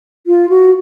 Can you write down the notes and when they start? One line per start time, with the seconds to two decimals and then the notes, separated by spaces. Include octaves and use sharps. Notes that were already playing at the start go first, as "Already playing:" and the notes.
0.27 F4
0.49 F#4